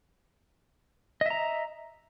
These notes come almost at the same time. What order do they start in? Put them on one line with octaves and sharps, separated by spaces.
D#5 E5 A#5